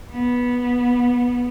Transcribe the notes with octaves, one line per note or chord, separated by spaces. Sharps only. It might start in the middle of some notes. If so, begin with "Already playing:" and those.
B3